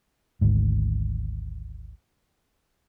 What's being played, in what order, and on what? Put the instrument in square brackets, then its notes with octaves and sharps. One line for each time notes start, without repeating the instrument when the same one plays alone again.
[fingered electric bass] G#1 D2 G#2